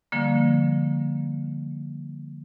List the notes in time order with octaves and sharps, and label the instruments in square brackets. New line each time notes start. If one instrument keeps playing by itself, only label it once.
[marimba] D3 F3 G3 A#3